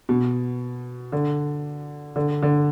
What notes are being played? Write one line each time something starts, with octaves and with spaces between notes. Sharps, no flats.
B2
D3
D3
D3